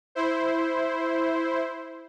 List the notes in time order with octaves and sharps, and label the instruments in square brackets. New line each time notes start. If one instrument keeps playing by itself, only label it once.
[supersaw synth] E4 C5